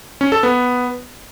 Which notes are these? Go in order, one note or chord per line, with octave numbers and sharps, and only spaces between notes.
C#4
A4
B3